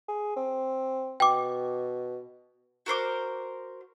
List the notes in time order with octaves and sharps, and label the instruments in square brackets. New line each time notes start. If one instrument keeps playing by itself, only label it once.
[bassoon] G#4
C4
[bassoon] B2 [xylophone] G5 D6
[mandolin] F#4 A#4 C5 D6